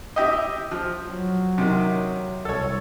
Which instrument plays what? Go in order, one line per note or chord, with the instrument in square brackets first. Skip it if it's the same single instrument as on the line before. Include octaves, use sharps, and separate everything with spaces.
[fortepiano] E4 G4 D#5
F3
[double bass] F#3
[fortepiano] C3 D#3
[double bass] C2 [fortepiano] A4 C#5